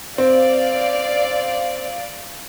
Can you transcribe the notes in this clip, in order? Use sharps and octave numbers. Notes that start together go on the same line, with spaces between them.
C4 D5 F5